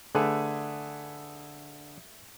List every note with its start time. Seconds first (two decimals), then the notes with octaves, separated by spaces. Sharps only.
0.15 D3 A3 G#4 B4